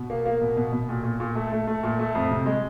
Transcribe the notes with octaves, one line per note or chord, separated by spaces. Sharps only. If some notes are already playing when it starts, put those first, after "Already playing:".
Already playing: B2
A#3
A#3
B2
B2
B2
A#2
A#2
A#2
A3
A3
A3
A#2
A3
F2
C3
G#3